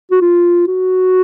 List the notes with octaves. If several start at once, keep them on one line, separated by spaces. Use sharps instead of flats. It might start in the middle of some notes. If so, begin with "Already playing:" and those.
F#4
F4
F#4